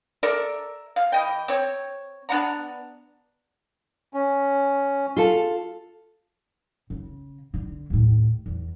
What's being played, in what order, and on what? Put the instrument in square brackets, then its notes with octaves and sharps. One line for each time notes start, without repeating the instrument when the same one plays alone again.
[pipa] A4 A#4 D5 E5
F5
E3 D#5 G5
C4 C#5
B3 D4 F#5 A#5
[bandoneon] C#4
[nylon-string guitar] F4 A4
[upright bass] C#3
D3
D#2 A2
E2